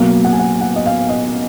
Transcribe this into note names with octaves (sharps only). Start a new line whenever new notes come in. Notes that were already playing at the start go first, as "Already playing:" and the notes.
Already playing: B2 F#3 A#3 F5
F#5
G#5
F#5
F#5
D#5
F5
D#5